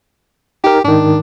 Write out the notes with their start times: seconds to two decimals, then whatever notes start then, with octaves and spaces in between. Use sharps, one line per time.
0.64 D#4 G4 A#4
0.84 G#2 D#3 D4